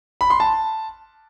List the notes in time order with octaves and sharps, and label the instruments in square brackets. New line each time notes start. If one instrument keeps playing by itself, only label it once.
[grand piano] B5
C6
A5